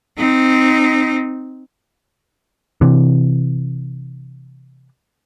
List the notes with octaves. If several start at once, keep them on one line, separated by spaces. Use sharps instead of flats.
C4 D#4
C3 E3